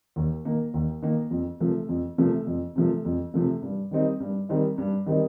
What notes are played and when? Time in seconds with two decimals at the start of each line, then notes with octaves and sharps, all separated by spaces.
0.16 D#2
0.45 D#3 A#3
0.74 D#2
1.02 D#3 A#3
1.31 F2
1.60 C3 F3 A3
1.89 F2
2.18 C3 F3 A3
2.47 F2
2.76 C3 F3 A3
3.05 F2
3.34 C3 F3 A3
3.62 G2
3.91 D#3 G3 C4 D#4
4.20 G2
4.49 D#3 G3 C4 D#4
4.78 G2
5.06 D#3 G3 C4 D#4